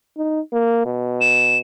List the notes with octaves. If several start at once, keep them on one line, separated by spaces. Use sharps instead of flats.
D#4
A#3
B2
E7